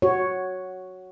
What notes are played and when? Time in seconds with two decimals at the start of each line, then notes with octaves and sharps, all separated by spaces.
0.02 F#4 C#5